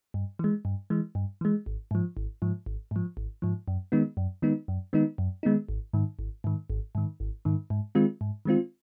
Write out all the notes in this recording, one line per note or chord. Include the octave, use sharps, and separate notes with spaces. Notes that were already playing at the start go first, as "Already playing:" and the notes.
G2
E3 G#3
G2
E3 G#3
G2
E3 G#3
G#1
G#2 F3
G#1
G#2 F3
G#1
G#2 F3
G#1
G#2 F3
F#2
D#3 G#3 B3 D#4
F#2
D#3 G#3 B3 D#4
F#2
D#3 G#3 B3 D#4
F#2
D#3 G#3 B3 D#4
G#1
G#2 D#3
G#1
G#2 D#3
G#1
G#2 D#3
G#1
G#2 D#3
G#2
D#3 G#3 C4 F4
G#2
D#3 G#3 C4 F4